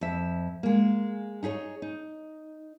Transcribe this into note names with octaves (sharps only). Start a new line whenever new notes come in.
F2 E5
G#3 A#3
D#4 E4 G#4 C#5
D#4